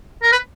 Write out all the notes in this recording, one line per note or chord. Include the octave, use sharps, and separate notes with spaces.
A#4
B4